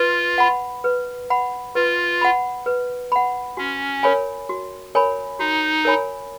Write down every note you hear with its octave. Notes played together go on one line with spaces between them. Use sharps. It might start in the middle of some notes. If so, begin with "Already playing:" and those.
Already playing: F4 B4
F#5 B5
B4
F#5 B5
F4 B4
F#5 B5
B4
F#5 B5
C#4 F#4
A#4 C#5 G#5 B5
F#4
A#4 C#5 G#5 B5
D#4 F#4
A#4 C#5 G#5 B5